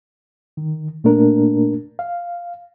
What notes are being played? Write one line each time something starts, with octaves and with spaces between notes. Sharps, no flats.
D#3
A#2 A3 A#3 D4 A#4
F5